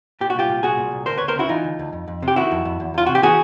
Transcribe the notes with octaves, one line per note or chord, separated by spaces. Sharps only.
A#2 G4
F#4
C2 F4 G4
A#2
C2 F#4 G#4
A#2
C2
D2 A#4 C5
D2 B4 C#5
A#4 C5
C#3 E4 F#4
E3 D#4 F4
D2
D2
F2
F2
C3
G4
D#3 E4 F#4
F2
F2
E2
E2 F4
C3 F#4
G4
E3 F#4 G#4